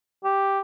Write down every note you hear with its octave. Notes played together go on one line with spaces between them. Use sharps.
G4